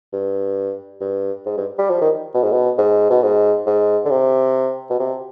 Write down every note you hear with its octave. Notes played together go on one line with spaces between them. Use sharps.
G2
G2
G#2
G2
G3
F3
D#3
B2
G#2
B2
G#2
B2
G#2
G#2
D3
C3
B2
C3